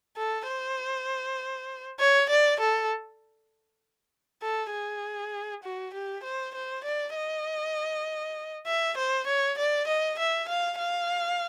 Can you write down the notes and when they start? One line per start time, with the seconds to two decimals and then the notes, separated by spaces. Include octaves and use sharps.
0.17 A4
0.48 C5
1.99 C#5
2.30 D5
2.60 A4
4.42 A4
4.72 G#4
5.64 F#4
5.94 G4
6.24 C5
6.55 C5
6.84 D5
7.15 D#5
8.67 E5
8.97 C5
9.27 C#5
9.58 D5
9.87 D#5
10.19 E5
10.48 F5
10.79 F5